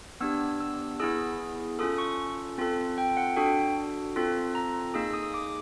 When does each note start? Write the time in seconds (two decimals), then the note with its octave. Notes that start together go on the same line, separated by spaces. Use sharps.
0.21 B3 D4 G4 E6
0.60 E6
1.00 B3 E4 G#4 E6
1.79 C#4 F4 A4 D#6
1.98 C#6
2.58 C4 F4 A4
2.98 G5
3.17 F#5
3.36 D4 F#4 A4 G5
4.16 C4 F4 A4
4.55 A#5
4.94 A#3 D#4 G#4 E6
5.14 D#6
5.34 D6